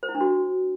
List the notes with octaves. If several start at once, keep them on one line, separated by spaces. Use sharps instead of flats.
C5
E4
D4
F#4